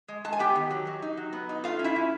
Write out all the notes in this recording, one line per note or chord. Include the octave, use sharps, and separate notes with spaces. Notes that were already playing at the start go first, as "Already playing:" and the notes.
G#3
G#3 A5
G#5
B3 G4 G5
D#3
F#3
F#3
D#4
F#3
B3
D#4
A3 F4 F5
C#4
E4 E5
C#4